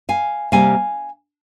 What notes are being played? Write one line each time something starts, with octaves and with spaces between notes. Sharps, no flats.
F5 G#5
C3 G3 A#3 F5 G#5